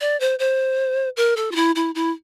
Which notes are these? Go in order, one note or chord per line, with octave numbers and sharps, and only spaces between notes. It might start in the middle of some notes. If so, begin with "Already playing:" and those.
D5
C5
C5
A#4
A4
F4
E4
E4
E4